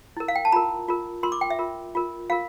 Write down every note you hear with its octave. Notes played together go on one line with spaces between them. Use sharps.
E4 A#4
F5
G5
A5
F4 A#4 A#5
F4 A#4
F4 A#4 C6
D6
G5
E5
F4 A#4
F4 A#4
F4 A#4 F5